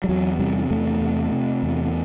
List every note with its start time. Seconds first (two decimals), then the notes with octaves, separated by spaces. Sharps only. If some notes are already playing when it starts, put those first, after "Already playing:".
0.04 G3
0.09 E2 F#3
0.39 C3 G3
0.70 E2 A3
1.01 C3
1.32 C3
1.63 E2